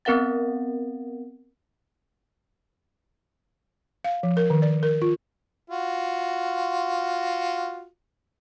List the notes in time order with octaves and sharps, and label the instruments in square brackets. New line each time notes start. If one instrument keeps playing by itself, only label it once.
[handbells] B3 C4 A#4 F5 F#5 A6
[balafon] F5
F3
A#4
D#3
D5
A#4
F4
[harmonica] F4 F#4